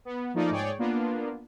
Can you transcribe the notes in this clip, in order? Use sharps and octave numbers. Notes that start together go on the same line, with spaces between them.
B3
F3 A3 A#3 D#4 F4 D5
G#2 G#4 C#5 D5 G5
A#3 B3 D4 F4